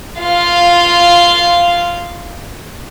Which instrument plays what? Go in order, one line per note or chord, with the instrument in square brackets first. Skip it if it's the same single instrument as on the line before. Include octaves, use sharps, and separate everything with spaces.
[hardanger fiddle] F4 F5